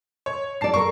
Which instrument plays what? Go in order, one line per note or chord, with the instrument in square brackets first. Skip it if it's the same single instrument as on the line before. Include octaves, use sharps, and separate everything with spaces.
[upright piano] C#5
[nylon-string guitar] G#2 D5 [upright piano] A5 C7
[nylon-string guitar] A4 A#4 D5 [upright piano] C#6